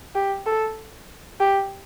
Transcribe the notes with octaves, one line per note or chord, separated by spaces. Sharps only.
G4
A4
G4